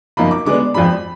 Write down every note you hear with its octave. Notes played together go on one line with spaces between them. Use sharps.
F#2 F3 A#3 D#4 B5
D6
D3 G#3 B3 D4 D6
F2 F3 G#3 D4 B5